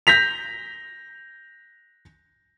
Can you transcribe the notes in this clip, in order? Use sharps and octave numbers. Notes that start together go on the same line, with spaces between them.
G6 A#6 B6 F7